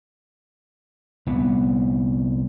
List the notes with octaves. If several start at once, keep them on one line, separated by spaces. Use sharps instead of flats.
C2 B3